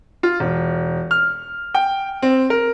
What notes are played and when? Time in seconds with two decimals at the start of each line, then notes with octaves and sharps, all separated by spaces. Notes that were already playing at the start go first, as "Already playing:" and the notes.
0.23 F4
0.40 E1
1.11 F6
1.75 G5
2.22 C4
2.50 A#4